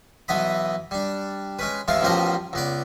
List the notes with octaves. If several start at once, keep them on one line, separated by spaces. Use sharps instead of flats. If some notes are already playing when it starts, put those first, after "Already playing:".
B1 E3 B3 D#5 B5
G3 D4
G#3 C#4 B4
A1 E2 E3 G#3 F5 A5
A1 B2 F3 G4 A#4 D#5
C#2 B3 D5